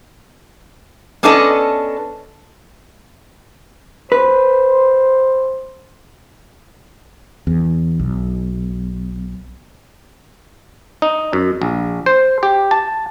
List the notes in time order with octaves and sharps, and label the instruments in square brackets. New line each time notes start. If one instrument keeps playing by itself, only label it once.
[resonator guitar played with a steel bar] B3 C#4 D4 A4 D#5 A5
[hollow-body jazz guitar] B4 [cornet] C5
[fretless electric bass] E2
B1
[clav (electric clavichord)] D#4
F#2
A#1
C5
G4
A5